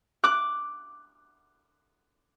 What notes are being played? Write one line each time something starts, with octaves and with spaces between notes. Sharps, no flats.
D6 F#6